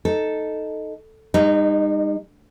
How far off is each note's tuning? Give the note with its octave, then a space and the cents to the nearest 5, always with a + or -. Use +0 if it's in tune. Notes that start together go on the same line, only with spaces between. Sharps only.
D#4 +0 A4 +0
G3 +45 D#4 -20